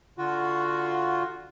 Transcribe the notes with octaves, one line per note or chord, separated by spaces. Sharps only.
D3 F4 F#4